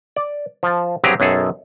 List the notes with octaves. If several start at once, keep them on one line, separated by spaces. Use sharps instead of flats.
D5
F3 A5
G2 F#3 C4 G4 G#4 A#5
B1 F#2 G#4 A4